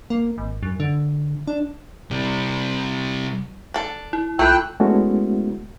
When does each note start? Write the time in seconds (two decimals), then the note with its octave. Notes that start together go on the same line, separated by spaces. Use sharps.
0.10 A#3
0.38 G#1
0.63 F#2
0.80 D3
1.47 D4
2.11 C3 G3
3.74 D4 A4
4.13 E4
4.39 C2 A3 F4 A4 G5 B5 E6 F#6
4.80 G#3 A3 B3 C#4 E4 F#4